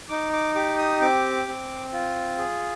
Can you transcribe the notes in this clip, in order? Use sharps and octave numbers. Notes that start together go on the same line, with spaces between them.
D#4 D6
D6
G4 D6
D#6
C4 D6
C4
F4
G#4